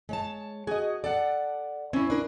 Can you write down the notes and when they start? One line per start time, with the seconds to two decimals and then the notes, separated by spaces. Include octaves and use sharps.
0.09 G#3 C#5 A5
0.67 F#4 G#4 D#5
1.04 A4 D5 F#5
1.93 C4 C#4 E4
2.10 D4 A#4